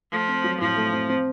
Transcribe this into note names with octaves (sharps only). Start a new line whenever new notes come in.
F3 A3
C4
F#3
A2 F3
A3
C4
C4